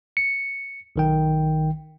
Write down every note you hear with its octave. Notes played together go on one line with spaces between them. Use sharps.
C#7
B1 D#3 G5